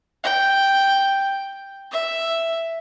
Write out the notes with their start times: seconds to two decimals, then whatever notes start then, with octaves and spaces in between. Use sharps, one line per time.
0.23 G5
1.91 E5